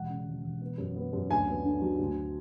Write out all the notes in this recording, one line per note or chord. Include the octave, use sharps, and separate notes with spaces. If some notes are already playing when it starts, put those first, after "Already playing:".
Already playing: E1 F#5
C#3
E1
E1
B3
F#2
B3
F#2
D2 G#5
B3
D3
F#3
D2